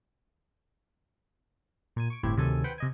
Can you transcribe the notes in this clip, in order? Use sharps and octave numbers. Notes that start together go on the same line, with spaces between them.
A#2 G#6 D#7
C#6 D7
G1 A2 C4 E4 G4 G#6
D2 C3 D#3 F#3 A4 G#5
B4 C5 F#5 G5
C3 D#5 G#5